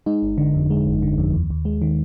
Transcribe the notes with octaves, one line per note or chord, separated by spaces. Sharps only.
G#3 D#4
G1
D3
F2
G#3
G1
D3
F2
D#2
D#2
G#3
D#3